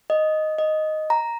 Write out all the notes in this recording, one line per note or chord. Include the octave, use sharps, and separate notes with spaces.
D#5
D#5
A#5